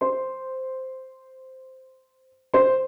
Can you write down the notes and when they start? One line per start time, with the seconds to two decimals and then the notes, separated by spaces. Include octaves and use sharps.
0.01 C5 C6
2.54 C5 C6